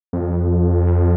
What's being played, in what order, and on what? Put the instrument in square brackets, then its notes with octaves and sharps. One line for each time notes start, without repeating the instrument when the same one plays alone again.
[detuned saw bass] F2